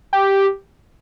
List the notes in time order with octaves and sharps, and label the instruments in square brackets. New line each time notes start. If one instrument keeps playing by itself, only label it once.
[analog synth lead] G4